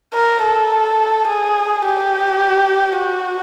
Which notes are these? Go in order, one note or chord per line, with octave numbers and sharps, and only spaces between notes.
A#4
A4
G#4
G4
F#4